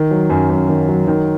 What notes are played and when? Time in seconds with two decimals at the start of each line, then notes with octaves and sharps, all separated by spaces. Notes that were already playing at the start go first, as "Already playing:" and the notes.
Already playing: D#3
0.11 F#3
0.30 F#2
0.50 F#2
0.69 D#3
0.88 F#3
1.08 D#3